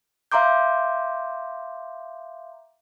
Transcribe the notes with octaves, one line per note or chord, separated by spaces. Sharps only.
E5 F5 A#5 C6 D6 G6